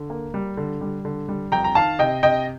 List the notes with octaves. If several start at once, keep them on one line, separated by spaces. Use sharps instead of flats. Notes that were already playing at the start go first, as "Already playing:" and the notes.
Already playing: D3
A#3
G3
D3
G3
D3
G3
F2 G5 A#5
A#5
D#3 F5 A5
C3 D#5 G5
C3 D#5 G5